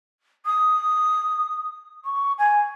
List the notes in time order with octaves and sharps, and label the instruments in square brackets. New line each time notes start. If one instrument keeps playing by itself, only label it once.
[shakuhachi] D#6
C#6
G#5